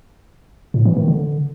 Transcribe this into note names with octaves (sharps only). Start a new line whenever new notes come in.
A2
E3
D#3
D3